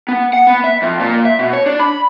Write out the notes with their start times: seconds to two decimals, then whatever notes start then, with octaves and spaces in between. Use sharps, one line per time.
0.08 B3
0.33 F#5
0.47 B3
0.64 E5
0.82 F2
1.00 A#2
1.25 E5
1.39 B2
1.53 C#5
1.66 D4
1.80 B5